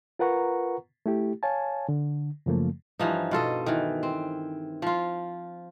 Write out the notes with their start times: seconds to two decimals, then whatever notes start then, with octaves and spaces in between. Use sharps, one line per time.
0.19 F4 A#4 B4 F#5 A#5 C#6
1.06 A3 E4 G4
1.43 C#5 F5 G#5 A5
1.89 D3
2.46 F#2 C#3 F3 A3 A#3
2.99 G2 E3 F3 D#4
3.31 B2 F4 A4 D#5
3.66 D#3 E3
4.03 C4
4.82 F3 F4